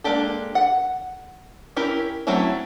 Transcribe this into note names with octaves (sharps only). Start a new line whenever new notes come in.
G#3 A#3 D4 G4 A4
F#5
C#4 E4 G4 A#4
F#3 A3 C4 C#4 E4